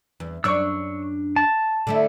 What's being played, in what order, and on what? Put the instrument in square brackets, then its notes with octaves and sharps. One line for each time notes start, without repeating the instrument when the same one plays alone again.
[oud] E2
[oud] F#2 D4 C#5 [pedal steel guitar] C#6 E6
[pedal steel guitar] A5
[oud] D3 A3 E4